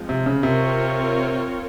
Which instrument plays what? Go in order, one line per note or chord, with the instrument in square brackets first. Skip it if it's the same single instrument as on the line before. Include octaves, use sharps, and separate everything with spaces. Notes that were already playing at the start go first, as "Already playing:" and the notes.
Already playing: [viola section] F3 G#3 C4
[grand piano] C3
C#3
[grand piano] C3 [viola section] C4 F4 A#4 C#5